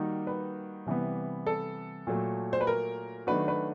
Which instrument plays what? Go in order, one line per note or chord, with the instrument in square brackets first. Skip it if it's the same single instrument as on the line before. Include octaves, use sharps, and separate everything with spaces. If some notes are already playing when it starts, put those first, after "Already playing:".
Already playing: [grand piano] D#3 G3 A#3 D#4 F#4
[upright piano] B4
[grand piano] C3 E3 G3 B3
[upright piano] A4
[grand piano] A#2 F#3 A3
[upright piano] C5
B4
A#4
[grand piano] D#3 F#3 A3 D4 F#4 [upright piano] B4
[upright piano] B4